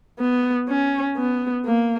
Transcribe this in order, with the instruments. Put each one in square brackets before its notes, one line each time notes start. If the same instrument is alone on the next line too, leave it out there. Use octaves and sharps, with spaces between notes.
[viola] B3
C#4
B3
A#3